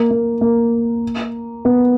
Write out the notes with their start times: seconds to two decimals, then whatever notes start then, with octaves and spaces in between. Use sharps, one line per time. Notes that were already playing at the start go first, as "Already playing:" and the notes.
Already playing: A#3
0.11 A#3
0.41 A#3
1.65 B3